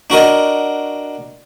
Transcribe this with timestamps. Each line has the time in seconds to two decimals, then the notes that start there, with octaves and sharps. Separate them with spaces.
0.10 D4 F#4 A#4 D#5